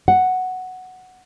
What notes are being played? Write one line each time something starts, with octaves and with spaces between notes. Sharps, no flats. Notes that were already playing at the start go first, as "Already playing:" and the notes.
F#5